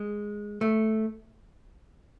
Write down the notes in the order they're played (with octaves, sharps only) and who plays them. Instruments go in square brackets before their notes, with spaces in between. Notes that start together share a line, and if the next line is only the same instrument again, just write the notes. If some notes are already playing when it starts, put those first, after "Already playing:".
Already playing: [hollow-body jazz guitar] G#3
A3